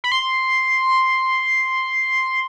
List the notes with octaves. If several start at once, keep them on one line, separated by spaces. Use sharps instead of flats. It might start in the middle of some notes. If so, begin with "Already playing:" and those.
B5
C6